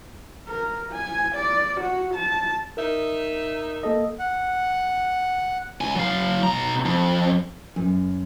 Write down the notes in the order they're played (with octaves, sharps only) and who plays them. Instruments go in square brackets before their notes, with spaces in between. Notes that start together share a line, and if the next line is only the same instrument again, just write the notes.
[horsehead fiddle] A#4
G#5
D5
F#4
A5
[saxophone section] D#4 E5 [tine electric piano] A#4
[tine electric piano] A#3 A4 D#5
[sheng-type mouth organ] F#5
[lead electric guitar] C#2 G#5
F#3 F5
B2 A#5
F2
[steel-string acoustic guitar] F#2